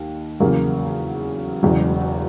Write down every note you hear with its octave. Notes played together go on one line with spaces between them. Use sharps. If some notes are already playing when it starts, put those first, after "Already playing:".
Already playing: D#2
E2 C#3 F#3 A#3
E1 E2 C#3 F#3